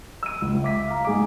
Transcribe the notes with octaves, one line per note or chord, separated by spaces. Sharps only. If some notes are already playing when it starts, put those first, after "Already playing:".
E6 D#7
C#2
E5 D6 B6
F5 A#5
G#2 G#4 D6